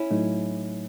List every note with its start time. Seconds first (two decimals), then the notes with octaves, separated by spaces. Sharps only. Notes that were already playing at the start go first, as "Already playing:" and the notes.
Already playing: C#4 E4
0.11 A2 F#3 A3 D#4